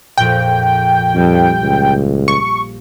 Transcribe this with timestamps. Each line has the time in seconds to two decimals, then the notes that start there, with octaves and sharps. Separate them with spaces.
0.18 A#1 F2 A#2 G5
1.16 F2 G3
1.62 C#2
2.28 C#6